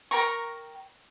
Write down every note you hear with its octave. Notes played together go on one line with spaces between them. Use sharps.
A#4 G5 A#5 C#6